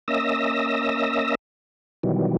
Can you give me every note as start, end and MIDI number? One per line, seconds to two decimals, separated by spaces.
0.08 1.35 58
0.08 1.35 61
0.08 1.35 75
0.08 1.35 76
0.08 1.35 88
0.08 1.35 94
2.03 2.37 47
2.03 2.37 51
2.03 2.37 52
2.03 2.37 54
2.03 2.37 55